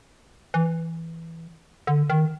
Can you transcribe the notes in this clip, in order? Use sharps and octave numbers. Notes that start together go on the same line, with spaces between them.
E3
D3
D#3